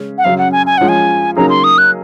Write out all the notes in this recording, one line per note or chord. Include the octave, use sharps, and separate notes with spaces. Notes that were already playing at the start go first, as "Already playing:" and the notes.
Already playing: C#3 G#3 C#4
F#5
F#2 C#3 F#3 F5
F#5
G#5
G#5
F#2 F3 G#3 C#4 F#5
G#5
C#3 F#3 A#3 D#4 G#4 A#5
C6
D#6
F#6